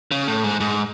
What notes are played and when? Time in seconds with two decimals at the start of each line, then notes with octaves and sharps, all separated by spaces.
0.11 C#3
0.28 A2
0.44 G#2
0.61 G#2